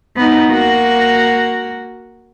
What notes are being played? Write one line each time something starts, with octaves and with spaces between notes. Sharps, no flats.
B3 D#4
A#3 F#4